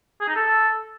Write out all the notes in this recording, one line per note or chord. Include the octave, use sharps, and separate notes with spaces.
G#4
D#4
A4